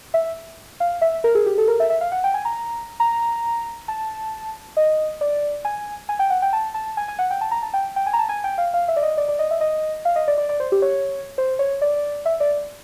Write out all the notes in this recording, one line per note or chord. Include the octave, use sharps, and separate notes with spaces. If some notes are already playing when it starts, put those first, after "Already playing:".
E5
F5
E5
A#4
G#4
G4
A4
A#4
E5
E5
F5
F#5
G5
G#5
A#5
A#5
A5
D#5
D5
G#5
G#5
G5
F#5
G5
A5
A5
G#5
G#5
F#5
G5
A5
A#5
A5
G5
G5
G#5
A#5
A5
G#5
G5
F5
F5
E5
D5
D#5
D5
D5
D#5
E5
D#5
F5
D#5
D5
D5
D5
C5
G4
C#5
C5
C#5
D5
E5
D5